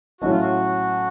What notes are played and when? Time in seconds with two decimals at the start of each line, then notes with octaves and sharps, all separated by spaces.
0.20 A2 F#3 A3 C#4 F#4
0.30 F4
0.40 F#4